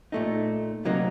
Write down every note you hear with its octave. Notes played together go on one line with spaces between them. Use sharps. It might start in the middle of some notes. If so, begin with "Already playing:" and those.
A#2 A3 D#4
D2 C3 F#3 A#3 D#4